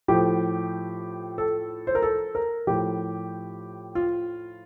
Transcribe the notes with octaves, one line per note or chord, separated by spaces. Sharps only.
A2 F3 G4
A4
C5
A#4
A4
A#4
A2 F3 G4
F4